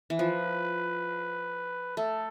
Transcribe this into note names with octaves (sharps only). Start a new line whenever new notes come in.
E3
F3 B4
A3 A4